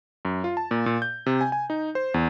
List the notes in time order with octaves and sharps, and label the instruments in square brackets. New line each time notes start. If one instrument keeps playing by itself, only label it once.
[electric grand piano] F#2
F4
A5
A#2
A#2
G6
C3
G#5
G#5
D#4
C5
E2